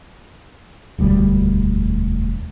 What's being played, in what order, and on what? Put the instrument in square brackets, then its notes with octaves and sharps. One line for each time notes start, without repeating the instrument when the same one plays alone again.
[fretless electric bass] E1 D2 G3